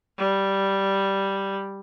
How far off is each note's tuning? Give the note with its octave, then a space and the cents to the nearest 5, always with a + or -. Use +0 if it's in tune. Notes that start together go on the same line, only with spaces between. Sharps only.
G3 -5